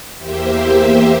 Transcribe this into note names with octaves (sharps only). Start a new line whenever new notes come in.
E2 A#3 G4 C5 E5